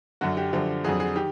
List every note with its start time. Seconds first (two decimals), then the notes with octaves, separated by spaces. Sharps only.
0.21 F#2 D3 F#3 F#4
0.37 G4
0.53 F#2 D3 F3
0.84 F2 D3 F#3 G#4
1.00 G#4
1.16 D#3 G4